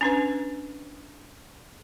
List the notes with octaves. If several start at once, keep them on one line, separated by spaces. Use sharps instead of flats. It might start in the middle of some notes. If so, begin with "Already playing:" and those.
C#4 D4 B4